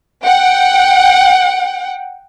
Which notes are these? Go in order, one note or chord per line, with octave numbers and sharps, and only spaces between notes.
F#5 G5